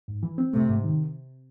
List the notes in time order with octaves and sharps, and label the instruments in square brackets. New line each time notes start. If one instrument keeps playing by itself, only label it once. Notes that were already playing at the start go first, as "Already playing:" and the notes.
[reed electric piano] G#2
E3
C4
[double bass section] C3 [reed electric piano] A3
[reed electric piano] G#2
D#3